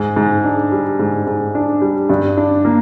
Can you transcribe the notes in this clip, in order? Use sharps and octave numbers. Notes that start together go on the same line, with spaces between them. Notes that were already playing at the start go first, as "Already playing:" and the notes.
Already playing: G#2
G#2
D4
G3
G#2
G#2
D4
G3
G2
D4
A#3